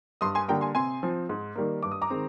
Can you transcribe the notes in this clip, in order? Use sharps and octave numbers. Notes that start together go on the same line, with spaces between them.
G2 C6 D#6
G#5 C6
D3 G3 A#3 G5 A#5
G#5 C6
C3 G#5 C6
F3 C4
G#2
D#3 G3 A#3
G2 D6
D#6
A#5 D6
D#3 G#3 C4